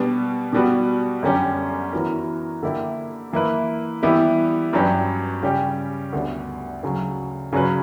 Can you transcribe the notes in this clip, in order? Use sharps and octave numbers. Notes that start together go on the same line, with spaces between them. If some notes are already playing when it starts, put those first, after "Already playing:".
Already playing: B2 G3 B3 D4
B2 G3 B3 F#4
F#2 D3 G3 C#4 G4
E3 B3 F#4 A#4
D3 A#3 E4 G4
E3 A#3 E4 B4
E3 G3 B3 E4 G4
G2 F#3 C#4 G4 B4
C#3 G3 C#4 G4
D2 D3 G3 B3 D4
D2 C#3 F#3
C#3 F#3 C#4 F#4 B4